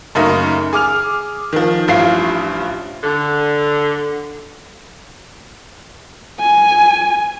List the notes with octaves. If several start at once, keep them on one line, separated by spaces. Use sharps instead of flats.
F#2 C#3 A3 A#3 D#4
G#4 D6 F6 F7
D#3 F3
A1 G2 F3 E4 F4 C7
D3
G#5